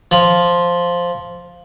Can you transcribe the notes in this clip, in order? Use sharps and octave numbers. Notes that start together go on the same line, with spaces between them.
F3